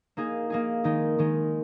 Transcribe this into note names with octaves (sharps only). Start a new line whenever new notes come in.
A#3 D#4 G#4
A#3 D#4 G#4
D#3 G#3 D#4
D#3 G#3 D#4